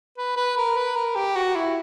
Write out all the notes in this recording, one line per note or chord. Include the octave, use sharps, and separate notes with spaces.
B4
B4
A#4
B4
A#4
G4
F#4
E4